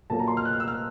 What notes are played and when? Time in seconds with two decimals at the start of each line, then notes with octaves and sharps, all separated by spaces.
0.10 A#2 F#3 A#3 A5
0.19 A#5
0.28 C6
0.37 F6
0.45 F#6
0.53 F6
0.60 E6
0.68 F6